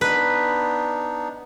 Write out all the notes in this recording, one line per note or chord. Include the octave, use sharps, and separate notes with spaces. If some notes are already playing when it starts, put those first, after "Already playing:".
B3 D4 D#4 B4